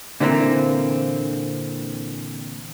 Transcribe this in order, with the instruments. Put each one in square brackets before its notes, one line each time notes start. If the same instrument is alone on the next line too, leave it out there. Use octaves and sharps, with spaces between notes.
[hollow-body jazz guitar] A#2 D3 E3 A3 A#3 C4